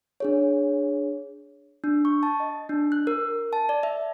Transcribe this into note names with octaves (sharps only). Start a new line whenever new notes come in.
D4 G#4 C#5
D4
C#6
A5
D#5
D4
F#6
A#4
A5
D5
E5